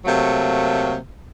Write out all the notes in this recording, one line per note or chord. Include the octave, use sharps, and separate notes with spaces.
C3 F#3 A3 A#3